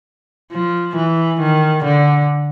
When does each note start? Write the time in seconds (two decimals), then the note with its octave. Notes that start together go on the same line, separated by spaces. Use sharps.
0.51 F3
0.96 E3
1.41 D#3
1.84 D3